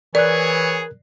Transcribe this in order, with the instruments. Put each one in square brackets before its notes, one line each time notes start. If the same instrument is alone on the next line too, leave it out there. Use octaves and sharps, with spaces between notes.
[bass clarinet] E3 [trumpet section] B3 G#4 C#5 [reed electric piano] A#4 F#6 [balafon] D5